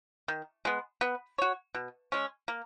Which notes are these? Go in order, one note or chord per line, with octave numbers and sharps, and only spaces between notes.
D#3
G#3 B3
B3
F#4 C#5
B2
G#3 C#4
A#3